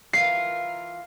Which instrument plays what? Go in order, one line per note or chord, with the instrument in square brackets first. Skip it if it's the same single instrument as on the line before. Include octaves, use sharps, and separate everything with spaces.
[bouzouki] E3 F4 A#4 [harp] C7